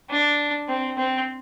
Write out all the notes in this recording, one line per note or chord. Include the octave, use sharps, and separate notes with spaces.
D4
C4
C4